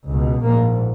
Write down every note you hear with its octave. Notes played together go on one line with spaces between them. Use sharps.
C#2 B2
A#1 G#2 A#3